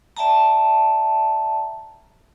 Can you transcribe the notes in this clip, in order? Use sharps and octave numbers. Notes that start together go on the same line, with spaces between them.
D5 E5 G5 A5 A#5